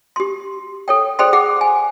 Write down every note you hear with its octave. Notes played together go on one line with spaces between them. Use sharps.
G4 C6
A4 C#5 G5
G#4 A4 C5 D5 G5 C6
G#4 F#5 D6
G#5